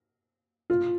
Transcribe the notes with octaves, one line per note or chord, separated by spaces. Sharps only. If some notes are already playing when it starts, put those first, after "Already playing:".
F4